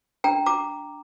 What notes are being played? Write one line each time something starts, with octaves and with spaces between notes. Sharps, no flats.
D4 G5 A#5
A#5 D6